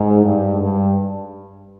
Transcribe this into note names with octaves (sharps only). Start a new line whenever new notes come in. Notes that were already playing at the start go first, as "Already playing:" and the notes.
Already playing: G#2
G2
G2